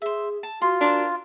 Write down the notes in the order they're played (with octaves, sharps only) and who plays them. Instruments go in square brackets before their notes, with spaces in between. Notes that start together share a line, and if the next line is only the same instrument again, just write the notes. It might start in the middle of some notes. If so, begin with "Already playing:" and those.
[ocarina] G#4 [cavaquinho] C5 E5
[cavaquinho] A5
[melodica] F4 [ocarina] F#4 [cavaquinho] C6
[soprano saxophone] D4 [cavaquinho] A#4 C5